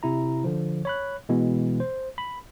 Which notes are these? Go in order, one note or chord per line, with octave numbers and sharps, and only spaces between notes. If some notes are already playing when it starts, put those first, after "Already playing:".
C3 E4 A#5
D3 F3
C#5 B5 F#6
B2 E3 G#3 B3
C5
B5